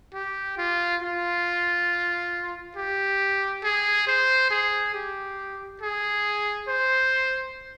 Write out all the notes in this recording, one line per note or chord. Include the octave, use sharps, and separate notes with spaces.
G4
F4
F4
G4
G#4
C5
G#4
G4
G#4
C5